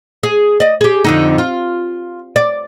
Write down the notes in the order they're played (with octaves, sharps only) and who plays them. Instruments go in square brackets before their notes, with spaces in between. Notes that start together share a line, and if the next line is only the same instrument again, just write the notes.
[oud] G#4
D5 D#5
G4 G#4
F2 D3 D#4
F4
D5